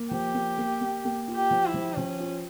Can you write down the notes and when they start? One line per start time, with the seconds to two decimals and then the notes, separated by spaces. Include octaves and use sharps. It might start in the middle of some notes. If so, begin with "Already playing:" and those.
Already playing: A#3
0.11 F3 G4
0.34 A#3
0.58 A#3
0.81 A#3
1.05 A#3
1.28 F4
1.35 G4
1.51 F3
1.66 E4
1.74 F3
1.96 F3 C#4
2.20 F4